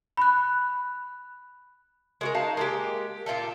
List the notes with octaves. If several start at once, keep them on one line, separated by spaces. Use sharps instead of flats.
B5 F#6
G#3 F#4 A#4
D#4 F5 A5
G#3 A#3 G4
A#2 F4 G4 A4